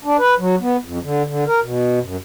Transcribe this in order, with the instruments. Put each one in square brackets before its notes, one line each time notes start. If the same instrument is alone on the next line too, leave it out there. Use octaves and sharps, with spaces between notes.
[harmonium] D4
B4
F#3
B3
F2
D3
D3
A#4
B2
F#2